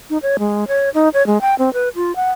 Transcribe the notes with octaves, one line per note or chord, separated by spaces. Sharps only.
D#4
C#5
G#3
C#5
D#4
C#5
G#3
G5
C4
B4
F4
F#5